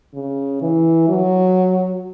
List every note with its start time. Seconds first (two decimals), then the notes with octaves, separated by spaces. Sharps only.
0.14 C#3
0.62 E3
1.09 F#3